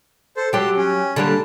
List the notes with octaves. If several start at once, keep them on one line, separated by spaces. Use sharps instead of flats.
A4 C5
F#3 G4 A5 C6
C#4
D3 G3 A#3 A5